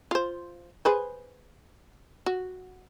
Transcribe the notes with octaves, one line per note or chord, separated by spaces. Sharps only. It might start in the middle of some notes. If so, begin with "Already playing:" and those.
F4 C5
G#4 B4 C5
F#4